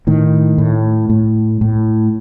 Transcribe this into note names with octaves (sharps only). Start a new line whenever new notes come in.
A2 D#3
A2
A2
A2